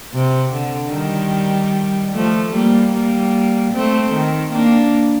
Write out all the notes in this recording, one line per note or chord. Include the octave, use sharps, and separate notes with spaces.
C3
D3
D#3 G3
F3 A3
G3 A#3
G3 A#3
A3 C4
D#3
A#3 D4